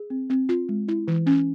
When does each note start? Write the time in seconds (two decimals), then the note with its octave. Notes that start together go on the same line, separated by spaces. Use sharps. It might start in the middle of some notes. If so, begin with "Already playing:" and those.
Already playing: G#4
0.10 C4
0.30 C4
0.49 F4
0.69 G#3
0.88 E4
1.08 E3
1.27 C#4